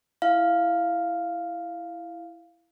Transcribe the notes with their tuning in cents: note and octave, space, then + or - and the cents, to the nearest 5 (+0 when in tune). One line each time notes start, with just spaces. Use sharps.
E4 +10 F5 +0